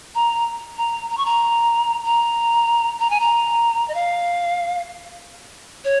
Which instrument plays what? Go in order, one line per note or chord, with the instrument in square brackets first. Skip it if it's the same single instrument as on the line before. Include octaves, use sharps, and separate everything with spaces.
[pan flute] A#5
A#5
A#5
C#6
A#5
A#5
A#5
G#5
A#5
D#5
F5
C#5